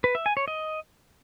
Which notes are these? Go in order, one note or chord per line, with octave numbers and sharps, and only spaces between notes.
B4
E5
G#5
C#5
D#5